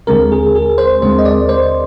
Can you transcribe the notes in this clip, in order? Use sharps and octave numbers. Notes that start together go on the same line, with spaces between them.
D#2 D3 G#3 C4 A#4
G#4
G#4
C5
D#2 D3 G#3 C4 C5
D#5
D5
C5